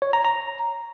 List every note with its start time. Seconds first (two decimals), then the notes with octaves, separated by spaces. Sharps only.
0.02 C#5
0.13 A#5
0.24 A#5